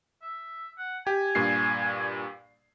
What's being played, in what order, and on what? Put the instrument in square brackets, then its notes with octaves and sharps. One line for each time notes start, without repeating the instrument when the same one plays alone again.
[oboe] E5
F#5
[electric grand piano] G4 [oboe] G#5
[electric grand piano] G2 A#2 C7